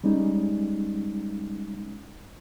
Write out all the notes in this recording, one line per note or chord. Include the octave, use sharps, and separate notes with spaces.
G3 G#3 C#4 D#4